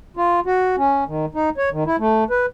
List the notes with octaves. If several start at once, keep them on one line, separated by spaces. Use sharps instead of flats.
F4
F#4
C#4
D#3
D#4
C#5
D#3
E4
A3
B4